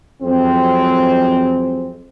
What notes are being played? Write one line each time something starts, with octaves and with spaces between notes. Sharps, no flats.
F2 F#3 G#3 C4